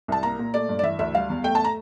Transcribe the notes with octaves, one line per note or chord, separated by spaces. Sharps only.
C2 A5
A#3 A#5
A#2
A3 D5
G2
D5
E3 E5
D2 E5
G3 F5
E2
A3 G5
A5
A#5